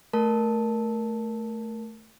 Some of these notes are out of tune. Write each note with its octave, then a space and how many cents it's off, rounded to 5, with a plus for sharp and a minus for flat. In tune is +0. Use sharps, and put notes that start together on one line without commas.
A3 +0 A#4 +10 A5 +0